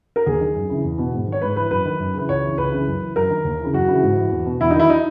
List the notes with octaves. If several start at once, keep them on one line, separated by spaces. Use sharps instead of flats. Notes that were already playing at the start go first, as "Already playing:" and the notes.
A#4
D#2 G#4
D#3
F#2
C#3 E3
E2
B2
G#2
D#3
C#5
G#2 B4
E3 B4
F#2 B4
D#3
F#2
C#3 E3 B4
C#2 C#5
C#3 E3
C#2 B4
C#3 E3
F#2
E3
F#2 A#4
D#3
D#2
C#3 E3
F#2 F#4
C#3 E3
G#2
E3
E2
B2
E2 E4
D#4
D#3 E4
D#4